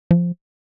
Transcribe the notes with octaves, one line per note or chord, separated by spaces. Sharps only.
F3